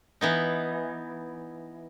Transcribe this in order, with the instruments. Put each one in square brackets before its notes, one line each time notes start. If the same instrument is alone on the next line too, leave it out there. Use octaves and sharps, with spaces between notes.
[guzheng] E3 B3 D#4